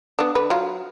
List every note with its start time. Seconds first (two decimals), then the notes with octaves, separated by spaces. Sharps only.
0.19 B3 D4
0.35 D3 B4
0.50 F#3 F4